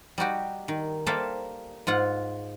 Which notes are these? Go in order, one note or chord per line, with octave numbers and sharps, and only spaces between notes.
G3 D#4 F#4 G4
D#3
G3 A#3 A4 C5 E5 F5
G#2 F4 F#5